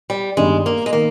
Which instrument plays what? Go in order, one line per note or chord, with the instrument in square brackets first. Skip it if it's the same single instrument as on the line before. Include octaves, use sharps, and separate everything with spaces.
[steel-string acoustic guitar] G3
[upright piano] G1 G2 D#3 G3 [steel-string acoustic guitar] G#3
[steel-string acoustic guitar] A#3
G#3
[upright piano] D#3 [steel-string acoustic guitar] A#3